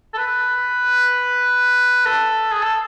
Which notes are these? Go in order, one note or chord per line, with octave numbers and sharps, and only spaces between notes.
A4
B4
A4
G#4
A4